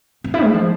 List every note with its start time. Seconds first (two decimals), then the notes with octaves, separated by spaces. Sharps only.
0.24 C4
0.34 E4
0.44 G#3
0.54 F3